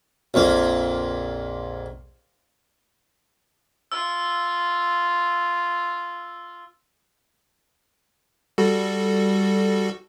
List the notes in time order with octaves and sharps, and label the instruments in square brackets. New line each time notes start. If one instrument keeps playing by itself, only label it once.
[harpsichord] A#1 F2 A#3
[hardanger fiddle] F4 [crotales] E6 F6
[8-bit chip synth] G3 F#4 A4